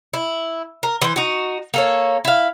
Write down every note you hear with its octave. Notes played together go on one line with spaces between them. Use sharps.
E4
A#4
E3 C5
D#4 F#4
A#3 A4 C#5
E4 F5